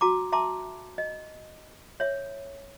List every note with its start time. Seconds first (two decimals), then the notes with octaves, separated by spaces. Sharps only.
0.01 F#4 A#5 D6
0.32 E5 A5 A#5 C6 D6
0.98 D#5
2.00 C#5 E5